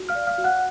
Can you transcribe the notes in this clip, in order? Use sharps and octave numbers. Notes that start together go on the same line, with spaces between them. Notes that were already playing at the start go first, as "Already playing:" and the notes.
Already playing: F#4
F5 F6
D5
F5 F6
F#4
F#5 F#6